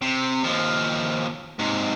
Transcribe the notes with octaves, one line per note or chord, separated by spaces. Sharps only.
C3
D#2 F3
G#2 C3